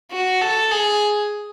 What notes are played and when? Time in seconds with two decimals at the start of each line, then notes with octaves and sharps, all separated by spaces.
0.12 F#4
0.41 A4
0.71 G#4